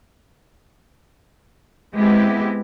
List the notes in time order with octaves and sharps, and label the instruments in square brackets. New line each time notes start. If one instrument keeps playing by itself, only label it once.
[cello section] G#3 B3 C4 E4 G4